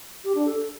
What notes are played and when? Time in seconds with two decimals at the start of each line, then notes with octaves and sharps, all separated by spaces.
0.24 G4
0.35 D4
0.45 A4